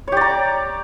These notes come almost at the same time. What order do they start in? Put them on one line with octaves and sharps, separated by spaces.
C#5 G4 D5 A#5